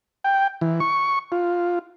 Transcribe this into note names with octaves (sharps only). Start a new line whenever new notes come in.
G5
E3
C#6
F4